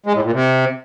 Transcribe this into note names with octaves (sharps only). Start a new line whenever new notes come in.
G#3
A2
A#2
C3